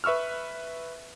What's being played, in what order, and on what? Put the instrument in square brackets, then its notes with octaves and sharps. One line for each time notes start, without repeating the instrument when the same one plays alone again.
[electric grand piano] B4 E5 C#6 E6 F6